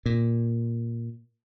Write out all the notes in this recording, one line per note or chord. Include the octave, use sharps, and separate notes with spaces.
A#2